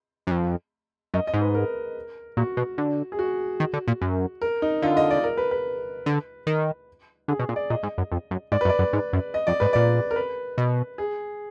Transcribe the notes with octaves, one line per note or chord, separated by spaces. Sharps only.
F#2
F2
F#2 D#5
D#5
G#2
B4
A#4
A#2 F#4
B2
D3
G#4
F#4
D#3
D3
A#2
F#2
A#4
D#4
D3 F4
D#5
D5
A#4
B4
B4
D3
D#3
D3 G#4
B2
A#2
D5
A#2 D#5
G#2
F#2
F2
F#2
G#2 D5
B4
F#2
D5
F#2
G#2
F#2
D#5
F2 D5
G#2 B4
A#2 D5
A#4
B4
B2
G#4